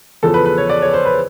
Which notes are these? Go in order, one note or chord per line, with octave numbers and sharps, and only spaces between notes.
E2 C#3 F3 A4
B4
B4
C#5
D5
C#5
C5
B4